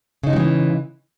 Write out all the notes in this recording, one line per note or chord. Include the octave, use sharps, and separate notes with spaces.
C#3 E3 F#3 G#3 D#4